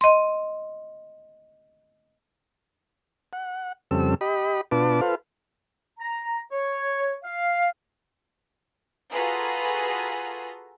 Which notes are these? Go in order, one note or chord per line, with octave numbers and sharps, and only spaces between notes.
D#5 C6
F#5
F2 C#3 G3 C4 A4 E6
G4 D#5 B5
B2 D4 F4 B4 A5 D6
F4 A4 B4 C5 F5
A#5
C#5
F5
F4 F#4 G#4 A4 B4 A#5